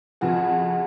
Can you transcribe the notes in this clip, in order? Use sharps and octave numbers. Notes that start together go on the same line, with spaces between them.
F2 C#3 F3 F#4 G#4